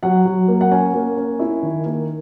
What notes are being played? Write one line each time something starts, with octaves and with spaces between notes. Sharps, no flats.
F#3 F#5
F#3
A#3
F#5
C#4 G#5
A#3
C#4
E4
D#3
A#3